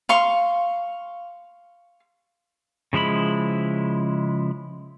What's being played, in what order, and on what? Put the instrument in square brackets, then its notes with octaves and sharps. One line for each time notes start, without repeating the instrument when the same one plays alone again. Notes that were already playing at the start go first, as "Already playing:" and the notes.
[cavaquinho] F5 C6 C#6
[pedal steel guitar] C#3 F3 G#3 E4 B5